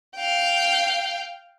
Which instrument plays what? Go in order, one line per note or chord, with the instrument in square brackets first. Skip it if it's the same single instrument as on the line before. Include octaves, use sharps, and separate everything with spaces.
[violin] F5 G5